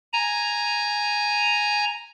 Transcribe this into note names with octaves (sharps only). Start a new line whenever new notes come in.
G#5 A#5